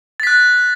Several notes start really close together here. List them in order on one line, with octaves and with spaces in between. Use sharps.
A6 B6 F#6